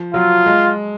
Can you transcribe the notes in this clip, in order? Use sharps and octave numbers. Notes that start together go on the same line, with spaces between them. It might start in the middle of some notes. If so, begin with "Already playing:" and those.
Already playing: F3
F#3 F4
G#3